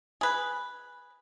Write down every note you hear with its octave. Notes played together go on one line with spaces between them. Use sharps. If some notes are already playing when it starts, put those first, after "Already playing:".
G#4 B4